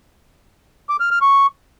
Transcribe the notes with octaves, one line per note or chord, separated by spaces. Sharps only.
D6
F6
F6
C#6